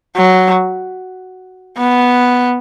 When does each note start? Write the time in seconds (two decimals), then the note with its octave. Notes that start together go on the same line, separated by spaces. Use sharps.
0.16 F#3
1.78 B3